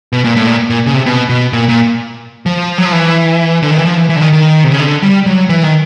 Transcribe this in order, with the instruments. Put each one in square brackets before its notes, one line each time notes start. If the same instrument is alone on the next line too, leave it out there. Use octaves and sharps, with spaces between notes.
[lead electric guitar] B2
A#2
A2
A#2
A#2
C#3
C3
B2
B2
A#2
A#2
F3
F#3
F3
E3
D3
D#3
E3
F3
E3
E3
D3
D#3
D#3
C3
C#3
D3
G3
F#3
E3
D#3